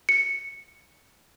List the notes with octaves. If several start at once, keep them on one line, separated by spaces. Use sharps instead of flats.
C#7